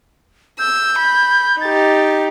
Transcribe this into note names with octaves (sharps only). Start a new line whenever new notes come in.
E6 G6
B5
D#4 G4 A6